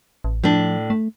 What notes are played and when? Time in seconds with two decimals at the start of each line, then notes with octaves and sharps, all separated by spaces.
0.24 A1
0.44 A2 F3 D4
0.90 A3